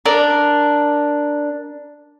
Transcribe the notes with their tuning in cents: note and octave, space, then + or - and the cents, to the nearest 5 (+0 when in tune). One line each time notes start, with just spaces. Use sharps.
D4 +0 A#4 +0